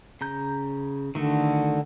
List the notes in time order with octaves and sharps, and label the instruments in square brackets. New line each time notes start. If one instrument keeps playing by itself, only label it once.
[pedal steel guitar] C#3 A#5 G6
[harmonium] D3 [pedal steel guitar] D#3 A3 F#4